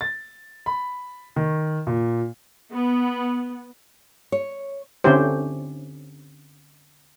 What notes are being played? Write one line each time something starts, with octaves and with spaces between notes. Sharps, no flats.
A6
B5
D#3
A#2
B3
C#5
D3 C4 C#4 E4 G4 C5